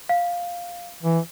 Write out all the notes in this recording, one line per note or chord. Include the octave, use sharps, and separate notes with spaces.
F5
E3